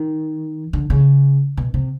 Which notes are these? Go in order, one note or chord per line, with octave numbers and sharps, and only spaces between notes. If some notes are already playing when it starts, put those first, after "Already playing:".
Already playing: D#3
D3
C#3
B2
C3